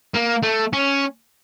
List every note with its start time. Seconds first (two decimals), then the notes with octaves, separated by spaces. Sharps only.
0.15 A#3
0.43 A3
0.73 C#4